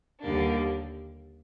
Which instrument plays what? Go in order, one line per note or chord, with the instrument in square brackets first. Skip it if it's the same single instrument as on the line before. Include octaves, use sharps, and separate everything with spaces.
[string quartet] D#2 D3 G3 A#3 D4